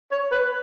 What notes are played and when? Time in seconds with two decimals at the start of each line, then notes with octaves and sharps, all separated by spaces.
0.12 C#5
0.32 B4